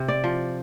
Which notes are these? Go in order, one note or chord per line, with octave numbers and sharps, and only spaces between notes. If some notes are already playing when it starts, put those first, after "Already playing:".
Already playing: C3
D5
F3